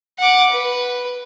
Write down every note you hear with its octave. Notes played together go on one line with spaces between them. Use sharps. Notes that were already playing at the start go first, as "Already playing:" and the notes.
F#5 D6
B4